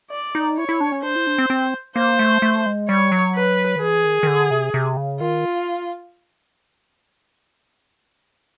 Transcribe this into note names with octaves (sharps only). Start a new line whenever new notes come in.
D5
D#4
E4 C#5
E4
D4
C#4
D4 C5
E4
D4
C4
C4
A#3 C5
A3
A3
G#3
G3 C#5
F#3
B4
D#3
E3 G#4
D#3
D#3
D3
C3
C3
C#3
D#3 F4